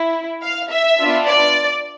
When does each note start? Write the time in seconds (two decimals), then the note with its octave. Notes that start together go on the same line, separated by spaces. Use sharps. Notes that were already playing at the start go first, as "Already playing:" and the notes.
Already playing: E4
0.42 F5
0.70 E5
0.99 B3 D4 F4
1.27 D5